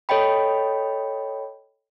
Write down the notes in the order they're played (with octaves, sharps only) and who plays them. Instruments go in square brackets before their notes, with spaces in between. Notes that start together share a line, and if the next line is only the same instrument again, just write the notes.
[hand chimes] A4 C#5 D#5 G5 B5